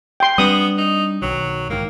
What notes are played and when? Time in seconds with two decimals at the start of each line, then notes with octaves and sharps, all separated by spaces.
0.20 G5 C6
0.38 G3 B3 C4 D4 D#6
0.78 D#4
1.22 B1 D#3 F#3
1.70 G#2 D#3 A#3